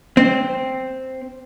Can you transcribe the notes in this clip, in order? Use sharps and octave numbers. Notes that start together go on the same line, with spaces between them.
C4